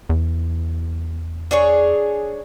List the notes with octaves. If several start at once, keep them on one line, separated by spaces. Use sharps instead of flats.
E2
D4 G#4 C#5